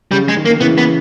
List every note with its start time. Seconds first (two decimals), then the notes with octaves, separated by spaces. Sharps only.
0.11 C#3 G3
0.29 G#3
0.37 D#3
0.45 A#3
0.50 D#3
0.60 C#3 E3 B3
0.78 B3